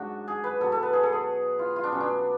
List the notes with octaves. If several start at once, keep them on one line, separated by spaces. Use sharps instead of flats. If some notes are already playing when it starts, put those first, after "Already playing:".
Already playing: G#2 F#3 D4 F#4
G#4
B4
B2 F#3 A4
A4
B4
G#4
A4
G#4
F4
F4
D4
B2 F#3 C#4
D4